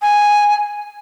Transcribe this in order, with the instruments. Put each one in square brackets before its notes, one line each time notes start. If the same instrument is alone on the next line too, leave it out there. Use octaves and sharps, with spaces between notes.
[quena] G#5